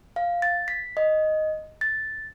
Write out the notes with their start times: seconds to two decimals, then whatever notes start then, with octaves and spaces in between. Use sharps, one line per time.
0.16 F5
0.42 A6
0.68 B6
0.97 D#5
1.81 A6